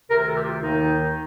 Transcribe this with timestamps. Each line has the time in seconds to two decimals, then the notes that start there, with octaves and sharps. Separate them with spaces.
0.10 D2 C3 D#3 A#4
0.28 A4
0.37 G4
0.45 F4
0.62 D#2 D#3 D#4